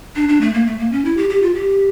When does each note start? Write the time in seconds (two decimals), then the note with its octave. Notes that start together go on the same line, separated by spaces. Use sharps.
0.16 D4
0.29 D4
0.41 A3
0.54 A#3
0.66 A3
0.79 A#3
0.92 C#4
1.05 E4
1.17 G4
1.30 G4
1.42 F4
1.55 G4